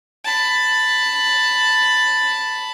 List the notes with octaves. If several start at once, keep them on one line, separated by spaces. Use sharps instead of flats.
A5 B5